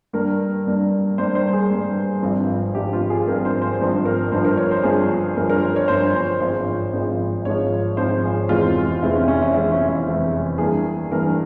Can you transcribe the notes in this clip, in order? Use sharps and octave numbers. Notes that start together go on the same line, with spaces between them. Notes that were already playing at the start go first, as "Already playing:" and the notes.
G2 G3 A#3 A#4
G2 G3 A#3
G2 G3 A#3 C5
C5
G#4
G2 G3 A#3
G#1 G2 F3 C4
G#1 G2 F3 C4 G4
F4
G#4
G#1 G2 F3 C4 A#4
C5
C5
G#1 G2 F3 C4
A#4
G1 G2 F3 C5
A#4
C#5
C5
G1 G2 F3 G#4
G1 G2 F3 A#4
A#4
C5
C#5
G1 G2 F3 C5
C5
G#1 G#2 F3 C5
G#1 G#2 F3
G#1 G#2 F3 C#5
G#1 G#2 F3 C5
G#4
F1 E2 E3 G#3 C4 F4
F1 E2 E3 G#3 C4 E4
C#4
C#4
E4
F1 E2 E3 G#3 C4 E4
C#4
E4
F1 E2 E3 G#3 C4
G2 E3 A#3 G#4
G2 E3 A#3 A#4